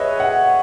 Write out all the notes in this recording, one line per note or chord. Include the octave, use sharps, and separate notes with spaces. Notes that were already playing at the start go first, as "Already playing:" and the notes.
Already playing: G#4 B4 C#5 D#5 E5
F#5